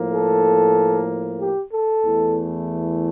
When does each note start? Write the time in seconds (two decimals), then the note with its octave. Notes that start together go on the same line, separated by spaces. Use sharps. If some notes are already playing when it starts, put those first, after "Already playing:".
Already playing: A2 F3 A#3
0.14 A4
1.41 G4
1.73 A4
2.05 E2 E3 A3